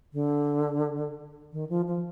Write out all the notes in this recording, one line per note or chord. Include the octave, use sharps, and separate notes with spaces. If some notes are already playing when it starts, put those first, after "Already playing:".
D3
D#3
F3
F3